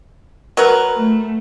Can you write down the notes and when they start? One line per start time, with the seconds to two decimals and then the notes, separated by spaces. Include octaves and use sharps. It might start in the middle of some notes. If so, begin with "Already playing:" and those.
0.57 F#3 A#4 B4
0.94 A3